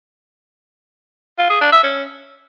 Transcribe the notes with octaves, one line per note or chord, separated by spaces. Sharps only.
F4
G#4
D4
E5
C#4